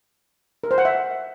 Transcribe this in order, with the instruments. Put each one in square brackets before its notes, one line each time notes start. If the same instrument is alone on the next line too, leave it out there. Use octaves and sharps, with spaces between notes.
[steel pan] A#4
C5
F#5
E5